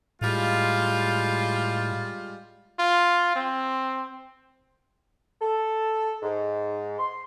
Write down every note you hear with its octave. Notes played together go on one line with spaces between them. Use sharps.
A2 G3 G#3 F4
F4
C4
A4
G#2
C6